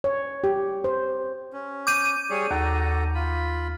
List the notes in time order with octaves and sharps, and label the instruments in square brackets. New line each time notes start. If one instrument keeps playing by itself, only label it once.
[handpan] C#5
G4
C5
[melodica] C#4
[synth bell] D6 G6 D#7
[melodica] G3 G#4 C#5
[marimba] D#2 [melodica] F#4 A4 A#5
[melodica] F4 B5